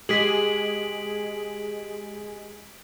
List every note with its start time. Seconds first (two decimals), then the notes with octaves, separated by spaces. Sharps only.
0.09 G#3 G4 G#4 B6 D7 F#7